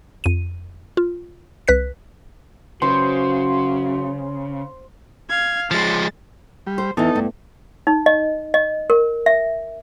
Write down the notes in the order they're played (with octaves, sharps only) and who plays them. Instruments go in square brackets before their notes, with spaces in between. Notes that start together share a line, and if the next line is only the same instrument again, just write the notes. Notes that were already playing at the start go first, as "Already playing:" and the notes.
[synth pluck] F2 D#7
F4
C2 B4 F#6 B6
[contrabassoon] F#2 [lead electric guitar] C#3 [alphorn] F#4 [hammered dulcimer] C5
[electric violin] F5 G#6
[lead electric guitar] F3 G#3 [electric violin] A6
[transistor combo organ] G3
[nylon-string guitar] C5
[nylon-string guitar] E2 E3 [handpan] B3 [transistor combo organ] D#4 A4
[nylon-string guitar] G2 [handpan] A3
[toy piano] D#4
D#5
D#5
A#4
E5